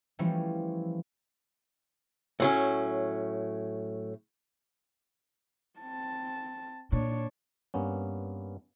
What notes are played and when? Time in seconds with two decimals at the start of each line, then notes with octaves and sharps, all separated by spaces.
0.19 E3 F3 G3 A3 C#4
2.40 A2 F#3 C#4
5.80 C4 A5
6.92 A#2 D4 C#5
7.74 G2 A#3 B3 C#4